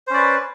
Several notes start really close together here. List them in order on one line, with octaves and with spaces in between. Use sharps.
C5 C#4 D5 B4